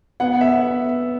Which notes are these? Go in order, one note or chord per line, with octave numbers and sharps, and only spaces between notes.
B3 F#5
E5